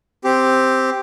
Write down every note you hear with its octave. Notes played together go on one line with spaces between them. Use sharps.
C4 G4